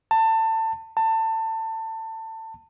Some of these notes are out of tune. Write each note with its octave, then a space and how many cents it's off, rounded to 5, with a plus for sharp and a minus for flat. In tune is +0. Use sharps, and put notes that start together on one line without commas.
A5 +25
A5 +25